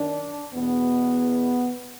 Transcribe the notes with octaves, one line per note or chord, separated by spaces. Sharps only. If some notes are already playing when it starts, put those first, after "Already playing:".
Already playing: F#2 D#3 D4
E2 B2 B3